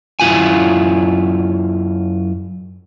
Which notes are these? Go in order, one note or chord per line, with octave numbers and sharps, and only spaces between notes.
F#2 E4 F4 G#5